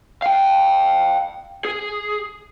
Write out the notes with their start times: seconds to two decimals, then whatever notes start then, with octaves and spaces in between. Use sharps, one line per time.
0.22 F5 G5
1.65 G#4